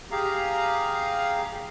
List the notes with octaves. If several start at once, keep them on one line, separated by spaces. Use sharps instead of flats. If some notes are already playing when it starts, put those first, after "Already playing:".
G4 G#4 F5 A#5